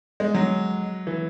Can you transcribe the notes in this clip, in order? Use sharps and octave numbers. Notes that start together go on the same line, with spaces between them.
G#3
F#3
E3